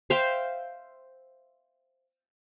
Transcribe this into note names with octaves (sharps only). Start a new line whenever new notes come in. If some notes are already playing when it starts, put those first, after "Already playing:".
C5 E5 F5 G5